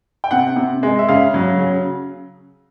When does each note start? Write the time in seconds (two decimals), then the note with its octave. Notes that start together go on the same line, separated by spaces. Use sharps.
0.24 G5
0.31 C3 F#5
0.56 C3
0.83 G#3
0.99 E5
1.08 C#3 F5
1.34 F#3
1.59 C#3